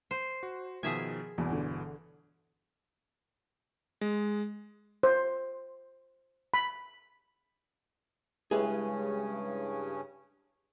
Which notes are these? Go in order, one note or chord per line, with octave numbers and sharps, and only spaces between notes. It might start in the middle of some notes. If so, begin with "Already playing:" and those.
C5
F#4
B2 D#3 F3 G#4 E5 G#5
G1 E2 B2 E3
D3
G#3
C5
B5
G2 C#3 G#3 C#4 E4 G4 G#4 B4